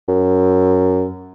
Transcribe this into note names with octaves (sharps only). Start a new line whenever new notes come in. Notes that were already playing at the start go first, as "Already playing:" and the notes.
F#2